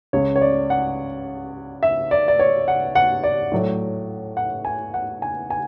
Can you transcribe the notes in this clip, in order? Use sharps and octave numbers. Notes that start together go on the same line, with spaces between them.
C#2 C#3 G#3 C#5
C#5
D5
F#5
E5
D5
D5
C#5
F#5
F#5
D5
A2 F#3 A3
F#5
G#5
F#5
G#5
G#5